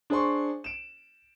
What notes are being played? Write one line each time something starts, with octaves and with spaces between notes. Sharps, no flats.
D4 G#4 C5 C6 C#6
D7 E7